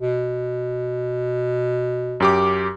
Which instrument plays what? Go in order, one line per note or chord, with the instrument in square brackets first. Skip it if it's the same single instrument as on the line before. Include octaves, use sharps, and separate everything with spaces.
[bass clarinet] B2
[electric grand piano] F#2 G4 D6